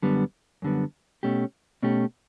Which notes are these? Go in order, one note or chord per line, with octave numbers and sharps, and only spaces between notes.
F#2 D3 G3 B3
F#2 D3 G3 B3
B2 A3 C#4 G4
B2 A3 C#4 G4